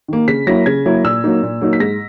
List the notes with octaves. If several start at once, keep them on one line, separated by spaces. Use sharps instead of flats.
D#3 A#3
C#3 B6
F#3 A#3 E4 A#6
C#3 G#6
F#3 A#3 E4
A#2 E6
F#3 A#3 D#4
A#2
F#3 A#3 D#4
B6
G#2 A#6